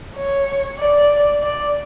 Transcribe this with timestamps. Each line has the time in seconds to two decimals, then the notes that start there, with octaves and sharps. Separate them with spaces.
0.17 C#5
0.80 D5
1.43 D5